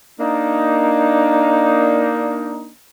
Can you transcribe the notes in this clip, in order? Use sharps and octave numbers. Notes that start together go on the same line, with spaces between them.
A#3 D4 D#4